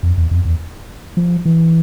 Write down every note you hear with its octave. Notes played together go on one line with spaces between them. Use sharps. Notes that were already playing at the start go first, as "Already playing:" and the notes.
F2
E2
F2
E2
F3
E3